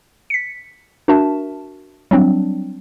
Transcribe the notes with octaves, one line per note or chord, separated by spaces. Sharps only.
B6 C#7
D4 F#4 A#4 E5 A5
F#3 G3 C4 D4